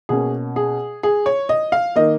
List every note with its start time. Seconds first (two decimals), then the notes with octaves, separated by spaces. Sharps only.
0.09 B2 A#3 C#4 G#4
0.56 G#4
1.03 G#4
1.26 C#5
1.49 D#5
1.72 F5
1.96 D#3 A#3 D#5